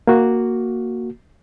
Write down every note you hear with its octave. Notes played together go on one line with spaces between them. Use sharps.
A#3 F#4